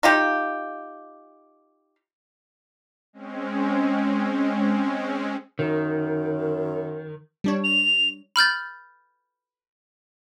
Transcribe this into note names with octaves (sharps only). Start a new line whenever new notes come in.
D#4 F4 G4
G#3 C4 C#4
F#2 D#3
G3 D4 C#5
F7
B5 F6 G6 A6